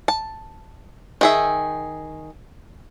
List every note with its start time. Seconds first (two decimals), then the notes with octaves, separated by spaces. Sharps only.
0.08 A5
1.21 D#3 G#4 E5